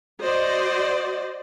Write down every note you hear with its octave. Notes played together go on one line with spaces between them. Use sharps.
F#4 C5 D5 D#5